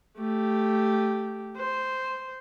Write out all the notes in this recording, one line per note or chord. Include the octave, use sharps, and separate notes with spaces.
A3 G4
C5